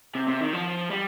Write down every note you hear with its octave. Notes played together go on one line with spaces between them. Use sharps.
C3
C3
D#3
F3
G3